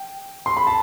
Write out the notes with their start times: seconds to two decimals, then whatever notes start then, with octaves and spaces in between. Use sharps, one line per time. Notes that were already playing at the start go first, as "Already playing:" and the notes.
Already playing: G5
0.46 C6
0.57 B5
0.67 A5